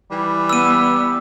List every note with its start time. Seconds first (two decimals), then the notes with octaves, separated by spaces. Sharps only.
0.11 E3 G3
0.49 B3 E6 D#7